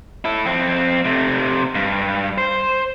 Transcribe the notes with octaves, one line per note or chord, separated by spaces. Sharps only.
E4 A4
F2 C4
C3 A3
G2
C5